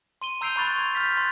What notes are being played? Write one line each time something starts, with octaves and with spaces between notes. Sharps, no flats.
C6 D#7 G7
A#5 E6 G6 C7 D7 F7
A#5 B5 C#6 F#6 A6 F7
C6 G#6
F6 G6 A6 B6
C6 F#6 A6